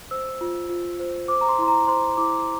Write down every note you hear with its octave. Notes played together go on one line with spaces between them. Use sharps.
C5 E6
F4
F4
C5
C5 D6
A#5
C6
E4 C6
A#5
C5 C6
E4 D6